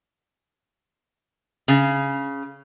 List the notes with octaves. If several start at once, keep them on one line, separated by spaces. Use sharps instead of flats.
C#3